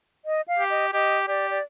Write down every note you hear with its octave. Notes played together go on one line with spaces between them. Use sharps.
D#5
F5
G4
D#5
G4 D#5
G4 D5
D5